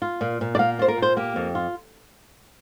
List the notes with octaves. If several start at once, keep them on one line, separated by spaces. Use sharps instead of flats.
F4
A#2
A#2
D5
A#3 F5
F4 C5
A#4
A#2
C5
A#3 G4
F2
F4